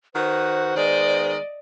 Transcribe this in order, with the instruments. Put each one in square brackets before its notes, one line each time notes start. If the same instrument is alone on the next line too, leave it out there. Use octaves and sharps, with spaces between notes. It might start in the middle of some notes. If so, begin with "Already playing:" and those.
[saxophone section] D#3 F#4 B4 [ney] C5
[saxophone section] D#3 G#3 B3 [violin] D5 D#5